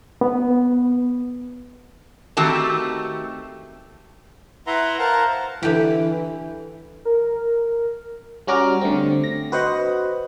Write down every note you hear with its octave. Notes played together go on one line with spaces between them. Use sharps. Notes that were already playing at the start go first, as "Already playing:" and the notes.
B3
D#3 A3 C4 F#4 G4 A5
E4 B4 E5 F#5 A#5 C6
A#4 C5 F5 F#5 A5 A#5
D3 E3 G4
A#4
G3 C#4 F#4 A#5 D6 F6
D3 A3 C4
A#6
F#4 B4 C5 D#5 F#5